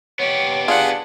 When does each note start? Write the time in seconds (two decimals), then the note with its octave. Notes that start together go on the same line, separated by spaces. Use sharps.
0.20 B3 G4 C#5
0.68 D4 F4 G#4 F#5